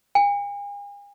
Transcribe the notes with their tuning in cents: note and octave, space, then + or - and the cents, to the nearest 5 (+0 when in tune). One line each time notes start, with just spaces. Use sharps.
G#5 -45